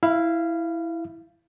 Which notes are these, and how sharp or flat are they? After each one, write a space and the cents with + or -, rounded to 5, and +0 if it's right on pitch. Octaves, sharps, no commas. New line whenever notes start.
E4 +0 F5 -20